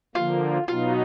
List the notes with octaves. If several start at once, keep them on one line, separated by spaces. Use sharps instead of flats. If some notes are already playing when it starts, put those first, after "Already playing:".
D3 F3 A#3 F4
B2 F#3 B3 D#4 F4